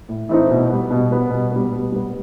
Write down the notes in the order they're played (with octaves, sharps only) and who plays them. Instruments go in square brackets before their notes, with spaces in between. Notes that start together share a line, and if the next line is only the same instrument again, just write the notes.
[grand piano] A2
E3 A3 C4 D#4
B2
G3 B3
B2
G3 B3
B2
G3 B3
B2
G3 B3